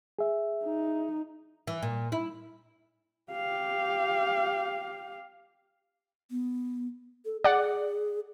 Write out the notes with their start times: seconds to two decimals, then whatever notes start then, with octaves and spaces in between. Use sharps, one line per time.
0.19 G#4 E5
0.64 D#4
1.67 E3
1.82 A#2
2.12 E4
3.32 G4 F5
6.31 B3
7.25 A4
7.44 G#4 D5 F#5